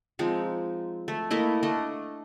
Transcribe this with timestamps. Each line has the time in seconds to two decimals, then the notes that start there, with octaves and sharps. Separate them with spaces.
0.19 F3 G#3 C4 D#4
1.08 A3
1.31 A3 A#3 E4 D#5
1.63 A3 D4 D#5